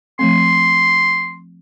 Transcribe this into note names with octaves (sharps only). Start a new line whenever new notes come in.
F3 A3 C4 C6